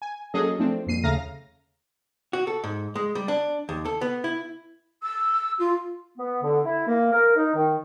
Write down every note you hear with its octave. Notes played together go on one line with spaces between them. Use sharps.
G#5
F#3 A#3 C#4 G#4 A4 D#5
F3 A3 C4 D4
C2 F2 A#2 C7 D#7
D#2 C#3 A3 F5 A#5 A#6
F#4
A4
G#2
G#3
G3
D4
D#2
A4
B3
E4
E6
F4
B3
D3
E4
A#3
A#4
D#4
D#3